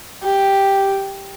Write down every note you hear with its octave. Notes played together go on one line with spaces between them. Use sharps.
G4